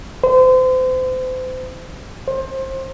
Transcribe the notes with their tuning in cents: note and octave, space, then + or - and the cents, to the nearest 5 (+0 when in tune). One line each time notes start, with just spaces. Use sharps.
C5 -35
C5 +25